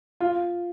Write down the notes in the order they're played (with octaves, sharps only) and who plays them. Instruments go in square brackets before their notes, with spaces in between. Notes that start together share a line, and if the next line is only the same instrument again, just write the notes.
[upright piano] F4